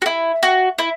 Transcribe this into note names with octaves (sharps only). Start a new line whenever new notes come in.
F#4
E4
F#4
E4